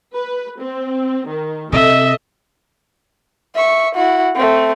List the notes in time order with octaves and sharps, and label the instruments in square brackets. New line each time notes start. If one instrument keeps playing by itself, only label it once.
[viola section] B4
C4
D#3
[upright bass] C3 [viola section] A4 D#5 [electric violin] E5
[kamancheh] E5 C#6
E4 F#4
A3 C4